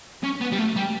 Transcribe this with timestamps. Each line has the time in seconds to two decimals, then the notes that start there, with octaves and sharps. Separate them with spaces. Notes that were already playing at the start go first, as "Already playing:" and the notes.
0.23 C#4
0.41 B3
0.52 G3
0.58 A3
0.76 G3